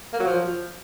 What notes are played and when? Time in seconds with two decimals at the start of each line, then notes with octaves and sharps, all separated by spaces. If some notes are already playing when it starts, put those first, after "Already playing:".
0.13 A#3
0.20 F#3
0.26 F3